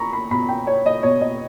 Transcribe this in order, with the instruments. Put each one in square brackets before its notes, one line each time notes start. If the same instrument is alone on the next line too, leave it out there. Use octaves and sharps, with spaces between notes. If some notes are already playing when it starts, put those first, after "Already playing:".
Already playing: [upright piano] A#5 B5 C#6
B5
B2 B5
G5
C#5
D#5
B2 C#5
D#5